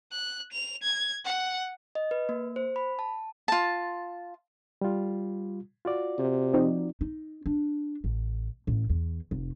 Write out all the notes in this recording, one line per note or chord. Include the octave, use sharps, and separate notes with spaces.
F#6
F7
G#6
F#5
D#5
B4
A#3
C5
B5
A5
F4 A5
G3 F4
F4 F#4 D5
C3
F3 C4 D#4
D#4
D4
A1
A1
E2
F1